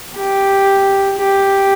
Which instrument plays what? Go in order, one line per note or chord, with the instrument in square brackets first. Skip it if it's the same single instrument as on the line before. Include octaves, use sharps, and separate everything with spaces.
[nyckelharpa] G4
G4